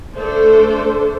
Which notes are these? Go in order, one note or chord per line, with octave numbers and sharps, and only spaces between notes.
A3 D4 A4 C5